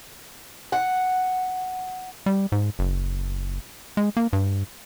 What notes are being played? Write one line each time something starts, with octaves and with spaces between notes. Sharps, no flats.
F#5
G3
G#2
F#1
G#3
A#3
G2